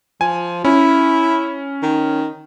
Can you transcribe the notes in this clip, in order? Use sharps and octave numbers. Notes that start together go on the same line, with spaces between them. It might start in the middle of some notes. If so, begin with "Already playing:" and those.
F3 G#5
C#4 E4
D#3